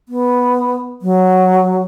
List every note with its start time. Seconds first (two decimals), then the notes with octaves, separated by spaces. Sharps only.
0.09 B3
1.02 F#3